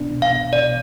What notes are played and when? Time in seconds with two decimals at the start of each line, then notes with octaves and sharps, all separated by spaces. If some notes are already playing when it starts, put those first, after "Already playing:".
Already playing: C2 B2 B3 D4
0.12 D4
0.22 F5
0.33 B3
0.52 B2 D5